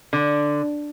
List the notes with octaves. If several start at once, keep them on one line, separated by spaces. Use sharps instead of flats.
D3